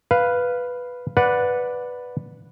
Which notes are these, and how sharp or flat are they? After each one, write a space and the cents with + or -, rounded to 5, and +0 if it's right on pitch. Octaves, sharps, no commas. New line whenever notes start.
B4 +0 F5 +0
B4 +0 D5 +0 F#5 -15